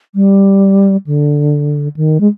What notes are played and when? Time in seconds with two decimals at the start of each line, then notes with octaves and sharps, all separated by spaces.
0.15 G3
1.07 D3
1.96 D#3
2.20 G#3